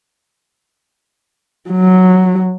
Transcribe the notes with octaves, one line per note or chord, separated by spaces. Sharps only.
F#3